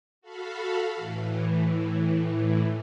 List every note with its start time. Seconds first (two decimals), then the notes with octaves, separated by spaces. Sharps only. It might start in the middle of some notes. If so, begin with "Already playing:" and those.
0.21 F#4 A4 F5 B5
0.95 A2 E3